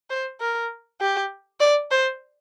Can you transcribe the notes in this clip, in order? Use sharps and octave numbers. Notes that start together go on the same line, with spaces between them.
C5
A#4
G4
D5
C5